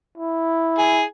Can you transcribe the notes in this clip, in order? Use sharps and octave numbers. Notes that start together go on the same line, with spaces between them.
E4
G#4